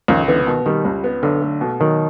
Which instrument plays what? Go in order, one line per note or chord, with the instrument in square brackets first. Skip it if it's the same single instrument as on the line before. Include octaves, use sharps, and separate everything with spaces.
[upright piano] C#2 [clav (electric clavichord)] D#3 F3
[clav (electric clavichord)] D3 E3 [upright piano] B3
[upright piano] B2 [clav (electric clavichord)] D#3
[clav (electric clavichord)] D#3 [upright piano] G3
[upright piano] C#2
B3
[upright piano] B1 [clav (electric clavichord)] D3
[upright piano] A3
B2
[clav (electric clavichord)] D#3 [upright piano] F#3